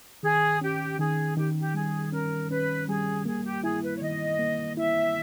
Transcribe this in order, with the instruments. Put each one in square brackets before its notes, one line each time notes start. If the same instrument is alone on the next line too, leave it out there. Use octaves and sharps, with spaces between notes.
[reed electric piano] D#3 [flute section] G#4
[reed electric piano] C#4 [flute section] G4
[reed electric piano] D#3 [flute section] G#4
[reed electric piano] D#3 [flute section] G4
[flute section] G4
[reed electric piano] G3 [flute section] G#4
[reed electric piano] C#4 [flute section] A#4
[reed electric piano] C#4 [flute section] B4
[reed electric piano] G3 [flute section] G#4
[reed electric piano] A#3 [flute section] G#4
[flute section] G4
[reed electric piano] E4 [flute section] G#4
[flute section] B4
C#5
[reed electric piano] D#3 [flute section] D#5
[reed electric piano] A#3
[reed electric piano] E4 [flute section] E5